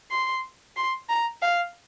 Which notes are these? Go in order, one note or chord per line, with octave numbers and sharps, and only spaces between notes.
C6
C6
A#5
F5